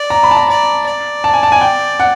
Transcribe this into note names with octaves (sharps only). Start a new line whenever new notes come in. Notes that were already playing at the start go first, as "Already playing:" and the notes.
Already playing: D5
A#5
B5
A5
A#5
D5 A#5
D5
A5
G#5
A5
G#5
G5
F#5